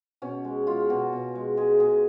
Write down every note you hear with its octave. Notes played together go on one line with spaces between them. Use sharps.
B2 C#4
G#3
G#3 F4
B2 F#4
B2
G#3
G#3 G#4
B2 G#4